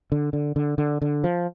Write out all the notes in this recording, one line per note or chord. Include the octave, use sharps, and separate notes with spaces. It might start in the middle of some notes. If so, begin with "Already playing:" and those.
D3
D3
D3
D3
D3
F3